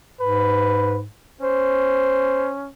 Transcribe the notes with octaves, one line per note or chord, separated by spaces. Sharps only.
G#2 B4
C#4 C5